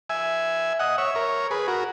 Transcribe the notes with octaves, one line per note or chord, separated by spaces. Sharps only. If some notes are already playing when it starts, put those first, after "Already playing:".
E5 G#5
D#5 F#5
C#5 E5
A#4 C#5
G#4 B4
F#4 A#4